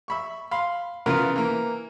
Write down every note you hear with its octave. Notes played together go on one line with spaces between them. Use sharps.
E5 B5 C#6
F5 B5 C6
C#3 E3 B3 F4 A#4 F6
E3 A#3